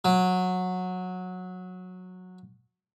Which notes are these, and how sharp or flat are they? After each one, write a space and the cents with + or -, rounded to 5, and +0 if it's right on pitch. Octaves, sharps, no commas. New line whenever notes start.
F#3 -15